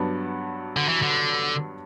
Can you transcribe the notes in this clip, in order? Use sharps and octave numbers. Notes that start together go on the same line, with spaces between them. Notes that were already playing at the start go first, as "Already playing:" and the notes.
Already playing: G2 F#3 B3 D4
D3
E3
D3